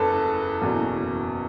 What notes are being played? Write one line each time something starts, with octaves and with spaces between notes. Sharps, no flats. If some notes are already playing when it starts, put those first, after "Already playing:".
Already playing: F#1 E2 A4 B4 A5
F#1 E2 B2